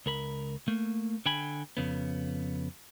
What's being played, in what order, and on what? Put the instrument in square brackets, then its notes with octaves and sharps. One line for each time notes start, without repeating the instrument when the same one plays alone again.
[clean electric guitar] C#2 A#4 B5
A3 A#3
D3 G5 G#5 B5
F2 C#3 B3